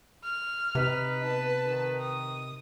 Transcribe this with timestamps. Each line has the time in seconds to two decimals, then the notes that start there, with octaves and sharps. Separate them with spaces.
0.24 F6
0.75 C3 D#4 B4
1.23 B3 A5
1.66 D#3
2.01 D#6